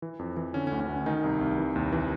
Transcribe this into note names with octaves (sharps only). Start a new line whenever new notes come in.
E3
F2
E3
D3 C#4
C#4
D2
C#4
D2
D#3 D#4
C2
C2
E3
D#2
E3